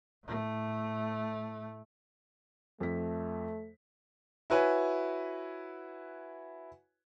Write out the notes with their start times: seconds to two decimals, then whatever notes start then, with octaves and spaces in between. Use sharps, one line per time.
0.25 A2 A3
2.80 F2 A3 B6
4.50 E4 F#4 B4 C#5 G#5